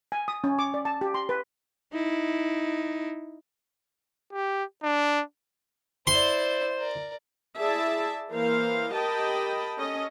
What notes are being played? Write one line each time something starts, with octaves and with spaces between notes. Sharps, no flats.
G#5
D#6
C#4
D6
D5
A5
G4
C6
B4
D#4 E4
G4
D4
E4 C5 D5 C6
A#4 D5
E4 G#4 D5 E5 A5
E3 A#3 A#4 C5 F5
G4 A#4 D#5 G5 A5 B5
C#4 A4 D#5